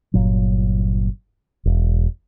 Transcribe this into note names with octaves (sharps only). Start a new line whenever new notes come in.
G1 A#2 F#3
E1